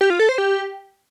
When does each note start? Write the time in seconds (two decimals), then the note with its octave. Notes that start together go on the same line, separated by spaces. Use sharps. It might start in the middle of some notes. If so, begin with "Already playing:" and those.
0.01 G4
0.10 F4
0.19 A4
0.29 C5
0.38 G4